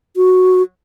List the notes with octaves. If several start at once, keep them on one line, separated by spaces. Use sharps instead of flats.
F#4